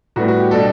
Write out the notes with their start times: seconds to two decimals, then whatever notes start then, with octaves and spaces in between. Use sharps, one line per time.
0.16 A2 G3 B3 F#4
0.28 F#4
0.40 G4
0.51 B2 G3 D4 A4